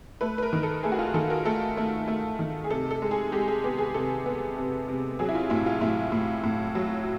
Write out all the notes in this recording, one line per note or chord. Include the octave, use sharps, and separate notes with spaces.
A3 B4
B4
A#4
D#3
A4
A3 G#4
F#4
F4
D#3 A4
A#4
A3 A4
A3
A3
D#3
G#4
C3 A4
A4
G#3
G#4
G#3 G4
G#4
B3 G4
G#4
C3 A4
B3
C3
C3
F#3 G#4
E4
F4
A2 E4
F4
A2 E4
A2
A2
F#3